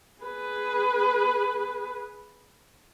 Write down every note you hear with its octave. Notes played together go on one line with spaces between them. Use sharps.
G#4 B4